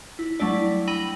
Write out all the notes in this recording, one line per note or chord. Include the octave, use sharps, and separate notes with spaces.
E4
F#3 G3 A3 D4 E4 D5
G5 B5 E6 A#6 D#7 F#7